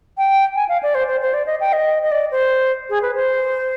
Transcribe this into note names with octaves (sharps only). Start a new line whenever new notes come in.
G5
G#5
F5
D5
C5
C5
C5
D5
D#5
G5
D#5
D#5
D5
C5
G#4
B4
C5